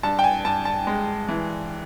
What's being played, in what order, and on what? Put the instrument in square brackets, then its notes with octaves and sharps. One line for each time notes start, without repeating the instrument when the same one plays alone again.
[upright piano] G2 A5
G5
G#5
G2 A5
A5
G#3
E3